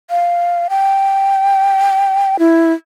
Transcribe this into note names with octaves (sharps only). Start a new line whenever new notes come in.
F5
G5
E4